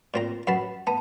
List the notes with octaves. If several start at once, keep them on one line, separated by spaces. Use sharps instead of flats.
A#2 C4 A#5
F#2 B4 F#5 A5
B3 A5